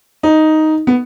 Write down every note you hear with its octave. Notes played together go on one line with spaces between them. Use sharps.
D#4
B3